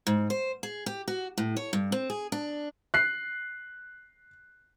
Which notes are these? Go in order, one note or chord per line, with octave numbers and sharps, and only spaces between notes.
G#2
C5
G#4
G4
F#4
A2
C#5
G2
C4
G#4
D4
F#6 C7